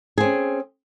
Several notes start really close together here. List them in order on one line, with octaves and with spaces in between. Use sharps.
G#4 C4 C#4